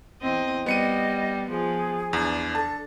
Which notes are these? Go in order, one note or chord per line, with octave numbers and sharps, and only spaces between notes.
E2 C4 D#5
G3 B3 D#5 C#7 D#7
F3 G#4
E2 D4
A4 A5